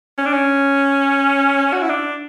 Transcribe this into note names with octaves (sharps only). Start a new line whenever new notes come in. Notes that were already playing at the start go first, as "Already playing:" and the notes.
C#4
D4
C#4
F#4
E4
D4